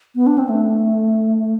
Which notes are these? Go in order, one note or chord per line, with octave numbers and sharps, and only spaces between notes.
B3
D4
C4
A3